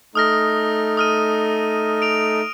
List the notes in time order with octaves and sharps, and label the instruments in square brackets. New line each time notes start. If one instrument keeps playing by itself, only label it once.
[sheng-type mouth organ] A3 D#4 [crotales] D#6 F6 A#6
[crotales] D#6 F6 D#7
D7 F7